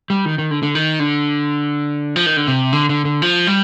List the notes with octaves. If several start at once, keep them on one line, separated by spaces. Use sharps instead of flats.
G3
D#3
D#3
D3
D3
D#3
D3
F3
D#3
D3
C3
D3
D3
D3
F3
G3